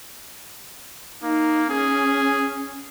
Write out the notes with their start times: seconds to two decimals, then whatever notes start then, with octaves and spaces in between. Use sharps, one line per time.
1.23 A#3 D#4
1.70 C#4 G#4